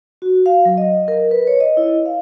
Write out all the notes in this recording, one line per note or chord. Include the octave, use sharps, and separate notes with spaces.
F#4
F5
F#3
D#5
A#4
B4
C#5
D#5
E4
F5